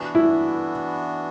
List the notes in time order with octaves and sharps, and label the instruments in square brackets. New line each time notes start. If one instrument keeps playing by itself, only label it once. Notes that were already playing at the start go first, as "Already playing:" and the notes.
Already playing: [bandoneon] E3 B3 D4 F#4
[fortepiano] E4